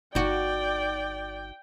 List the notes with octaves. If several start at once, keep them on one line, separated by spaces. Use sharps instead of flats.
G1 D#4 F#4 D5 G5